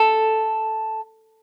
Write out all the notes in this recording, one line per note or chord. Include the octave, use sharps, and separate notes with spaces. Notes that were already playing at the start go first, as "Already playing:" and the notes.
Already playing: A4